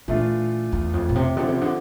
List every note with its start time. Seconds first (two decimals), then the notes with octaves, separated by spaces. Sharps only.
0.08 A#2 E3 A3 D4 F4
0.72 E2
0.93 F2
1.09 A#2
1.15 C3
1.36 D3 F3 C4 E4
1.48 C3
1.61 D3